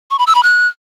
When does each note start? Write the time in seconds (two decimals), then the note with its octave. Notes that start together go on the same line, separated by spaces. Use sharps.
0.11 C#6
0.19 B5
0.27 E6
0.35 B5
0.43 F#6